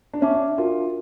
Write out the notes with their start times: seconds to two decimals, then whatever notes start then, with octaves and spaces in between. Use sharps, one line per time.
0.14 D4
0.21 C#4 C#5 E5 A5 D6
0.34 D4
0.58 D4 F4 F#4 A#4